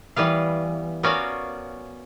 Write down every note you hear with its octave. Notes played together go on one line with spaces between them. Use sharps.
E3 G3 B3 F5
B3 C#4 F#4 A#4 D5 F5